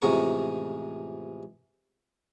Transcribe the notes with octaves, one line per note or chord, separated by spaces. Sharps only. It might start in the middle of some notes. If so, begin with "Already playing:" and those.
A1 F2 C3 G#3 A#4 C#6